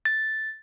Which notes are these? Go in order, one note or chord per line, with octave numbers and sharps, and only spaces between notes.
A6